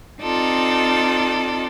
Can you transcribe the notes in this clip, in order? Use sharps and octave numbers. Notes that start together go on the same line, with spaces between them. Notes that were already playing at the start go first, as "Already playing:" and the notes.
C4 D#4 F4 A4 D5